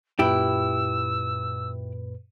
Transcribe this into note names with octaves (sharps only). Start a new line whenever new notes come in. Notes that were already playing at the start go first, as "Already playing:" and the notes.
F#2 A#2 E4 G4 B4 E6